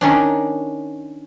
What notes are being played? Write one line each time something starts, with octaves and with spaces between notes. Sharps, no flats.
D#3 C#4 D4